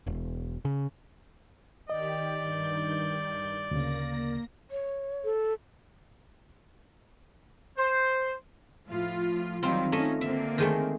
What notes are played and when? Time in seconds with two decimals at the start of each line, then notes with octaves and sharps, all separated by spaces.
0.07 E1
0.65 C#3
1.90 D#3 G4 D5 D#5 G5
2.39 G2 D#3 G6
3.71 D2 C#3 A#3 A#6
4.71 C#5
5.24 A4
7.78 C5
8.86 A2 F3 F4
9.63 D#3 F#3 G3 C4 F4
9.92 A3 C#4 D#4 D#5
10.21 D3 A#3 C4 E5
10.58 D#3 G#3 A3